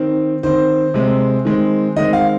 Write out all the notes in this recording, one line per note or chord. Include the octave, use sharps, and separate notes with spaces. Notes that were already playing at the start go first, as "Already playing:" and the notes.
Already playing: D#3 C4
D#3 C4 C5
C3 G#3 C4
D#3 G#3 C4
D#3 G#3 C4 D#5
F5